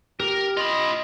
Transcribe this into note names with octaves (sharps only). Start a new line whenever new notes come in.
G4 A#4
F4 D#5 B5 D#6